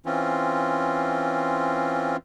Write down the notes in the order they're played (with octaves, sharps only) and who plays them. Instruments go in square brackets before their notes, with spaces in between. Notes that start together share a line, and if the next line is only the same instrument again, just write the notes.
[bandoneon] E3 C4 C#4 F4